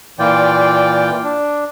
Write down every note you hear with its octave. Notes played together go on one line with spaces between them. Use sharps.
A#2 E3 F4 D5 G5
D4